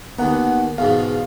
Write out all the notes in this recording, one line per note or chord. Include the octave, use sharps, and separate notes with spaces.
D#2 D#3 B3 F#5 A#5
E2 G#2 B2 F5